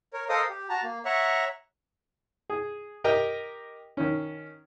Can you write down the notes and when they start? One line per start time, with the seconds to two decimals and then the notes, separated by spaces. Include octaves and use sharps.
0.13 A#4 C#5
0.29 A4 A#4 C5 D#5 F5 D#6
0.49 G4
0.69 F#4 A5 A#5
0.83 A#3
1.05 C#5 E5 F#5 A#5 C#6
2.50 G#4
3.04 G4 A#4 D#5 G5
3.97 D#3 C#4